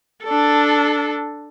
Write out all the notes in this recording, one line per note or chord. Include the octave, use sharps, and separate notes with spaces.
D4 A4